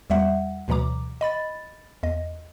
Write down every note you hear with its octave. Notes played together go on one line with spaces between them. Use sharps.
E2 G3 E5 F#5
D2 B2 E3 F#3 A#5 D6
D#5 B5 A6
E2 D#5